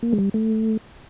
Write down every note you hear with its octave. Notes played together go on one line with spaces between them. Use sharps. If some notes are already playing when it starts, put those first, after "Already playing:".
A#3
G#3
G3
A3